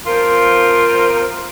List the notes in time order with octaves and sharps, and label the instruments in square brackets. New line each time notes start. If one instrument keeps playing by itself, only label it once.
[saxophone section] F3 C4 F4 A#4